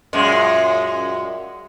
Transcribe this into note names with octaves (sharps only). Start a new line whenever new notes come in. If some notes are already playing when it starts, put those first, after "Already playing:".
F#2 A#2 G#3